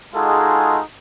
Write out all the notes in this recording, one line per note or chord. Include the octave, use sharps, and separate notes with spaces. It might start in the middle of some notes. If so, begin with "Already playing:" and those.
G#3 D#4 F4 F#4 G#4 A4